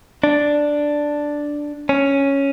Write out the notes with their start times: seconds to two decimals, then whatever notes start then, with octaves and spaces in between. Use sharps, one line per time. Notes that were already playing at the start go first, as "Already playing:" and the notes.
0.24 D4
1.89 C#4